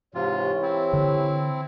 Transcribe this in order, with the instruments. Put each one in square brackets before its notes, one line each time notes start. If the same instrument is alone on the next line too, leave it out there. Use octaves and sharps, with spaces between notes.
[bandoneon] G#2 C3 F4 [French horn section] E3 G4 C#5
[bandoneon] C4 E4
[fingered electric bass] D3